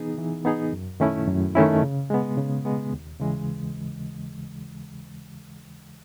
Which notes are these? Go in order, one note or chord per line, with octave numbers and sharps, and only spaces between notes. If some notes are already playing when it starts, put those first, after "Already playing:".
Already playing: E3 B3 D#4 G#4
E3
B3 D#4 G#4
F#2
D#3 A3 C#4 E4
F#2
D#3 A3 C#4 E4
C#3
G#3 B3
C#3
G#3 B3
D#2
C#3 E3 G#3